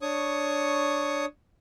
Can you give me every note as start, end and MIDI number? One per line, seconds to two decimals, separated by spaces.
0.02 1.25 62
0.02 1.25 73
0.02 1.25 85
0.02 1.25 87